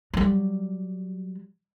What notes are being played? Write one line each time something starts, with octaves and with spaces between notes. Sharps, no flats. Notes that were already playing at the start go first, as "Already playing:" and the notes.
F#3 G3